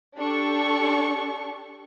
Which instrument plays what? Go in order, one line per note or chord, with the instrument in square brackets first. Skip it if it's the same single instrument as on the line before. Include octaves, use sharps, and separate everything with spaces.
[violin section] D4 G4 A4 C#6